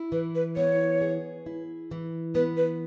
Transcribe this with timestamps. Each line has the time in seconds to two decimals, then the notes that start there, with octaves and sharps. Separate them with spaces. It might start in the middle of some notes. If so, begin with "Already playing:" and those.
Already playing: E4
0.12 E3 B4
0.35 B4
0.56 B3 C#5
1.01 G#4
1.46 E4
1.91 E3
2.35 B3 B4
2.57 B4